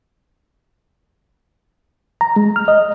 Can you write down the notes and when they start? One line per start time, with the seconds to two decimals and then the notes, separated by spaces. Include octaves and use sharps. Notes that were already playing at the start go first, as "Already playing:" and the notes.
2.21 A#5
2.36 G#3
2.56 F6
2.68 D#5